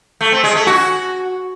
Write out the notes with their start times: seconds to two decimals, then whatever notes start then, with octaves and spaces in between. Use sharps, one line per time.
0.21 A3
0.32 C4
0.44 G#3
0.55 A3
0.67 F#4